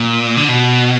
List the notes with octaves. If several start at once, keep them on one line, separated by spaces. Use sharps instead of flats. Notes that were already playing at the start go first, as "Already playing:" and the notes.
Already playing: A#2
D3
B2